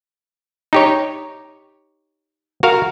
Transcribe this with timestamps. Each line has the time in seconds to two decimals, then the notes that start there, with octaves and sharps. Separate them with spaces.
0.73 D#4 G4 C#5
2.63 F#4 A#4 F5